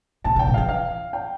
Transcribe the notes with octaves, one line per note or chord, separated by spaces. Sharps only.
A2 A5
B2 G5
A2
E3 F5
F5
G5